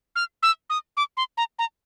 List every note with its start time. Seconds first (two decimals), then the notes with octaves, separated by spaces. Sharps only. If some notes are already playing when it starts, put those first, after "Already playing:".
0.16 F6
0.43 E6
0.70 D#6
0.97 D6
1.17 C6
1.37 A#5
1.59 A#5